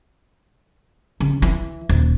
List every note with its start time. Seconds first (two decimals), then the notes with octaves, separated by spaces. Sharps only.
1.20 C#3
1.42 E3
1.89 D#1